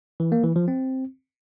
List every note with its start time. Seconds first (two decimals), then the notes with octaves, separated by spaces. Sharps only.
0.20 E3
0.32 A#3
0.44 E3
0.56 F3
0.68 C4